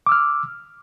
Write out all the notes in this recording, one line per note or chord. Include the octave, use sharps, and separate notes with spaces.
D6 E6 F6